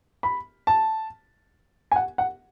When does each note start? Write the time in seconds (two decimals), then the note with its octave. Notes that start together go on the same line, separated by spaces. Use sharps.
0.23 B5
0.67 A5
1.92 G#5
1.96 F#5
2.18 F#5